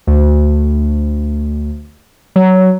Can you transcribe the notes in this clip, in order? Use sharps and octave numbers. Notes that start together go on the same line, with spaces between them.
D2
F#3